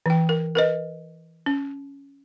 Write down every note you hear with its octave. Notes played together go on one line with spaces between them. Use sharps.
E3 G5
A#4
A#4 B4 D#5
C#4